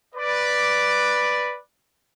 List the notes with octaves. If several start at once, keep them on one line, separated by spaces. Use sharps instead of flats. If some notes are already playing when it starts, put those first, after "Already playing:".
B4 D5